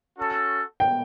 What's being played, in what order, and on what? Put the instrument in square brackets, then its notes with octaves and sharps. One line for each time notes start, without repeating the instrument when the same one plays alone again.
[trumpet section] C#4 F#4 A4
[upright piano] G5